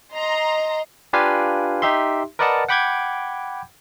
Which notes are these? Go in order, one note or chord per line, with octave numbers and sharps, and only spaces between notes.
D#5 A#5 C6
D4 F4 G4 B4 F5 G#5
D#4 G4 E5 C6
A#4 B4 D5 D#5 F#5 A5
F#5 G5 B5 D6 G6 G#6